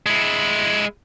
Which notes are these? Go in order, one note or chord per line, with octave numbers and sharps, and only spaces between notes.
G#3 E4